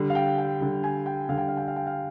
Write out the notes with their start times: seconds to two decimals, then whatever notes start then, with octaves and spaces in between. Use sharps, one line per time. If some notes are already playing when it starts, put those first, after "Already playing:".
Already playing: D3 G3
0.10 F5
0.15 G5
0.38 G5
0.61 D3 G3
0.84 G#5
1.06 G5
1.29 D3 G3 F5
1.38 G5
1.49 F5
1.57 G5
1.68 F5
1.76 G5
1.87 F5